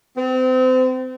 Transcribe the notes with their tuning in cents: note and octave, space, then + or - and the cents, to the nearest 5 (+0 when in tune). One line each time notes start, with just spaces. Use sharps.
C4 -30